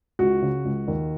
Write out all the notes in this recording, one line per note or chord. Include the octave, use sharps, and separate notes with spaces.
C#2 F#4
C#3
C#2
D#2